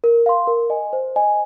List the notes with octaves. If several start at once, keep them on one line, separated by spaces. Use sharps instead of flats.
A#4
F5 C6
A#4
D#5 G#5
C5
D#5 G#5